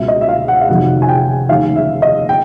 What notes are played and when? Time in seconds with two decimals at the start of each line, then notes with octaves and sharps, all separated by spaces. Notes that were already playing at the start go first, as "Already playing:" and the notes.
Already playing: C#2 B2 F#3 E5
0.08 D#5
0.21 E5
0.29 F5
0.48 F#5
0.61 F5
0.68 F1 F2 C3 D#3 F#3 F#5
1.02 G#5
1.09 G5
1.49 F1 D#2 C#3 F5
1.76 E5
2.02 D#5
2.29 G5